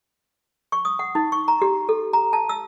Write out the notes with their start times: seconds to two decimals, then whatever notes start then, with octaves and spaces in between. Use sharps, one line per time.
0.72 C#6
0.85 D#6
0.99 F#5
1.15 D#4
1.32 C#6
1.48 A#5
1.62 G4
1.89 A4
2.13 A#5
2.33 A5
2.49 E6